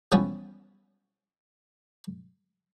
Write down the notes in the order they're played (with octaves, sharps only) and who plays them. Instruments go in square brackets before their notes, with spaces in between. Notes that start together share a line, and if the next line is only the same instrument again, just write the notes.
[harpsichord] E3 F3 G3 B3 C#4